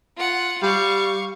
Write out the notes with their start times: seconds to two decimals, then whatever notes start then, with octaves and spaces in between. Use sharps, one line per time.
0.17 F4 F#5
0.63 G3 F5 C#6